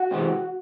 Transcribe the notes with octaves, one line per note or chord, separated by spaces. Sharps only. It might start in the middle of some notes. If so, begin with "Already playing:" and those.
Already playing: F#4 F#5
C3 E3 G#3 C4